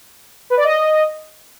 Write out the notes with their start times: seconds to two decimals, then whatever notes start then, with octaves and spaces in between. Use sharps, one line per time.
0.50 B4
0.57 D5
0.64 D#5